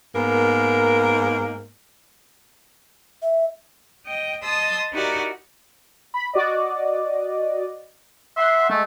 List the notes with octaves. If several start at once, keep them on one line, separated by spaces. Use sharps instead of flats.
G#2 A#3 B3 A#4
E5
D#5 G5
D#5 A5 C6 D#6 E6
D#4 E4 F#4 G4 A#4 D5
B5
F#4 D5 D#5
E5 F#5 C6
G#3 A3